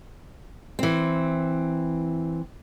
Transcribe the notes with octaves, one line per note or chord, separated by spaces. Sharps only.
E3 C4